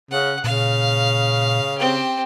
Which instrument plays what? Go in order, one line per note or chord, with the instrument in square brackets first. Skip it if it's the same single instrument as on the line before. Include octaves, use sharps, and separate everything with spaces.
[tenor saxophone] C#3 [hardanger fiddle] F#5
[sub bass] A#2 [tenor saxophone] C#3 [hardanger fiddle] F5
[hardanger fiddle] C4 G4